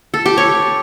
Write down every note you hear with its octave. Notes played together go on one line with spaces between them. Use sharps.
A4
G4
C#5